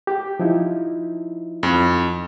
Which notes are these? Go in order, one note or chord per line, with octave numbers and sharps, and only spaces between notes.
G4
F3 D#4 E4
F2